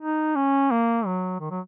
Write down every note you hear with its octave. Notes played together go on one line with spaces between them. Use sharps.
D#4
C#4
A#3
F#3
D#3
F#3